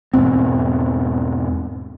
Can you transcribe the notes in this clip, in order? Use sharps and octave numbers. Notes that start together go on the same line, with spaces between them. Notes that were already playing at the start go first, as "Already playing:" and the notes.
E2 G#2 B2 C4